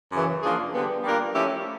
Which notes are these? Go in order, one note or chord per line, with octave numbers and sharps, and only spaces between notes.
F#2 C#3 E3
F3 A#3 D4 F4 G#4
D3 G3 B3
G3 A#3 D4 F4 A#4
F3 A3 C#4 E4 G4